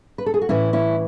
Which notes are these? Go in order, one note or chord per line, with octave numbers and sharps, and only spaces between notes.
B4
A4
G#4
F#4
A2 E3 C#4 E4
C#4 E4